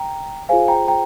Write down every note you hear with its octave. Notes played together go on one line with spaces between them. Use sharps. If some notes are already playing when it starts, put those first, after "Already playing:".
Already playing: G5 A#5
F4 G#4 C5 F5 G#5
G5 A#5
G5 A#5